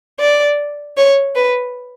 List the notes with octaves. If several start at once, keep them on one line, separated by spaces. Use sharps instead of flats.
D5
C#5
B4